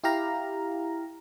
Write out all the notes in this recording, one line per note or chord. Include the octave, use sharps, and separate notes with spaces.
E4 G4 F5 A#5